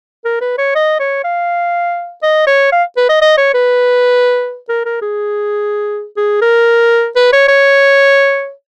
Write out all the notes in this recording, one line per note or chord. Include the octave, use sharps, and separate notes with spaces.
A#4
B4
C#5
D#5
C#5
F5
D#5
C#5
F5
B4
D#5
D#5
C#5
B4
A#4
A#4
G#4
G#4
A#4
B4
C#5
C#5